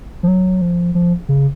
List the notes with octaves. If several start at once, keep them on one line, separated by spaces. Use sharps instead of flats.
F3
F#3
F3
F3
C#3